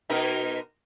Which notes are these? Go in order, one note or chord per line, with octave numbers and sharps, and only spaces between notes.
B2 D#4 A#4